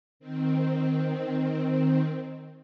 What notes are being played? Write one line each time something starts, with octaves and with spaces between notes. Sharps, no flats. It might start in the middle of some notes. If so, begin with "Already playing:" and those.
D#3 C4